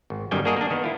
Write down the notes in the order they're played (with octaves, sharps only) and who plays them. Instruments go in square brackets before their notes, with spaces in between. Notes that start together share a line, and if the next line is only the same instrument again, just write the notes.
[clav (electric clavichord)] G#1
G1 F#2 D#3 G3 G5 G#5
A#3 D4 F#4 G#4 A#4 D#5
A#3 D4
D#3 B3
E4 F4